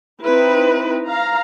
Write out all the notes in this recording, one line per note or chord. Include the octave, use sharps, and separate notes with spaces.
C4 D#4 E4 B4
F5 A#5